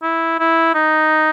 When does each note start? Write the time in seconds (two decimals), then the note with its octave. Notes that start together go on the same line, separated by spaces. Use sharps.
0.02 E4
0.39 E4
0.74 D#4